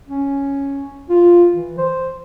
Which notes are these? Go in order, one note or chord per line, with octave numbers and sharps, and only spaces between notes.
C#4
F4
E3
C5